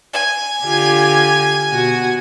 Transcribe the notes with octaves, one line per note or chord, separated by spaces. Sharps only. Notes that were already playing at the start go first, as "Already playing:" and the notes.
G#5
D3 F4 G4
B2 F#4